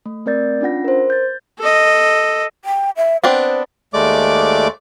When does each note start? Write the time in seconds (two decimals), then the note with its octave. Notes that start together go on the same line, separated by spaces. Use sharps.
0.06 A3
0.26 A3 C4 A#4 D5 G6 A6
0.61 C#4 D4 F4 F#5 A#6
0.85 A#4 C5
1.10 G6 A6
1.59 A4 D#5
2.65 G5
2.97 E5
3.24 B3 C4 D4 C5
3.94 D#2 G#3 A3 D5 D6